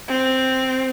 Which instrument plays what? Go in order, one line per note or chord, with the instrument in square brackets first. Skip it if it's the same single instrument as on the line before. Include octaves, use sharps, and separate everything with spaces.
[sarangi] C4